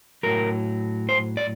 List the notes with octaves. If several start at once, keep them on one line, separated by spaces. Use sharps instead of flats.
A2 F#3 A#4
C5
D5